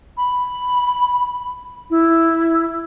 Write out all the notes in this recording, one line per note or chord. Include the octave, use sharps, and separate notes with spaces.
B5
E4